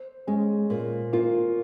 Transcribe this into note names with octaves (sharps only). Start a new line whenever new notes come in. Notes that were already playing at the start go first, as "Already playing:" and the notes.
Already playing: C5
G#3 C#4
A#2 A#3
A#3 F4